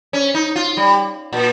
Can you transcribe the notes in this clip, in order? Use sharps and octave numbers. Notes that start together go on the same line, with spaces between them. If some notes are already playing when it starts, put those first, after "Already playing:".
C#4
D#4
F4
G3
A#2